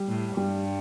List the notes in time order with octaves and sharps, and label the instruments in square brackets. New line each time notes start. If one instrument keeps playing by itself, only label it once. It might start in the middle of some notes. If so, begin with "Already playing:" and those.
Already playing: [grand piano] G3
[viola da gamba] A2
[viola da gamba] G2 [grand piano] G3